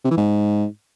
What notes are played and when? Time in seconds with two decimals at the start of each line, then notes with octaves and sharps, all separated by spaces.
0.05 C3
0.11 E3
0.17 G#2